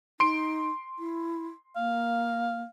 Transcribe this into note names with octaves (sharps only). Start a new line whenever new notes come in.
D#4 C6 D7
E4
A#3 F5